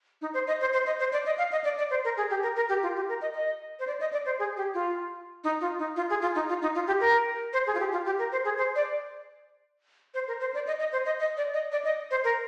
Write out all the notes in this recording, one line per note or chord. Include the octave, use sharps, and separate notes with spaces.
D#4
C5
D#5
C5
C5
D#5
C5
D5
D#5
F5
D#5
D5
D5
C5
A#4
G#4
G4
A#4
A#4
G4
F4
G4
A#4
D#5
D#5
C5
D5
D#5
D5
C5
G#4
G4
F4
D#4
F4
D#4
F4
G#4
F4
D#4
F4
D#4
F4
G4
A#4
C5
G#4
F4
G4
F4
G4
A#4
C5
G#4
C5
D5
C5
A#4
C5
D5
D#5
D#5
C5
D#5
D#5
D5
D#5
D5
D#5
C5
A#4